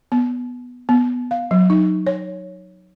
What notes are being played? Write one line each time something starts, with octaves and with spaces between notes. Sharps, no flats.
B3
B3
F5
F#3
D#4
C#5